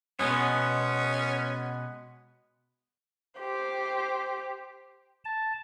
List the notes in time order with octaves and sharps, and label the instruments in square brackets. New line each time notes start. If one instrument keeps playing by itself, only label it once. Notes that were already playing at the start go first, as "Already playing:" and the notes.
[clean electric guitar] B2 G#3 B3 [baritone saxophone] C#4
[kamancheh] G4 C5
[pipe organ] A5